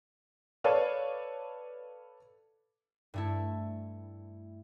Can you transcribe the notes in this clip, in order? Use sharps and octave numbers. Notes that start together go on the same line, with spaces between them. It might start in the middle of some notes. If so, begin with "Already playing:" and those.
A4 B4 C#5 D5 F5
G2 A3 E4